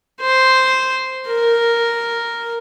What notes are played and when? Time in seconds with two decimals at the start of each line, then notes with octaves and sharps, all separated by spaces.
0.21 C5
1.27 A#4